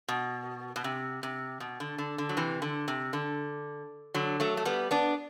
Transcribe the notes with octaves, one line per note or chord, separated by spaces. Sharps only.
B2
B2
C3
C3
B2
D3
D3
D3
F#3
C3 E3
D3
C3
D3
D3 F#3
F#3 A3
A3
G3 B3
B3 D4